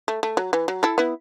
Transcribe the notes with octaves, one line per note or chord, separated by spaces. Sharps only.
A3
A3
F#3
E3
F#3
E4 A4
B3 E4